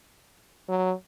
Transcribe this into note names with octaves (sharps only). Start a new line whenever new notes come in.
F#3